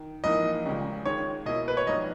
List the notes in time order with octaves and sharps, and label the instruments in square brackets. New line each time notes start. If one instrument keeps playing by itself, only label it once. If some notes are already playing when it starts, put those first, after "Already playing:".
Already playing: [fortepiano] D#3
[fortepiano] A#1 G#2 E3 A#3 [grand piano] D#5
[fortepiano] C#2 C#3 G3
[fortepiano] D#3 G#3 C#4 [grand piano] C#5
[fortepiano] B2 A#3 E4 [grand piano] D#5
[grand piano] B4
C#5
[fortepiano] A#1 G#2 G3 [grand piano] D#5